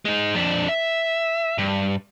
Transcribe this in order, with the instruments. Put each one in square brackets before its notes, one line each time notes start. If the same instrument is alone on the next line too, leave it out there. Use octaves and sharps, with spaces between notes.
[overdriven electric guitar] G#3 D#4
F2 D4
E5
G2